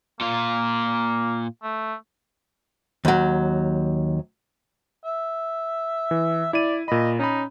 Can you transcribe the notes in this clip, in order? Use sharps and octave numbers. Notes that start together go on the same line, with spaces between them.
A#2 A#3 F4
A3
D#2 F#3
E5
E3
E4 D5 D#7
A#2 D#5 B5
C#4 D#4 B5